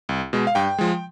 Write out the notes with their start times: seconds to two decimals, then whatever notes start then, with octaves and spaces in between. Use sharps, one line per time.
0.09 C2
0.33 B2 G#3
0.47 F5
0.55 G2 G5
0.79 F3 G#3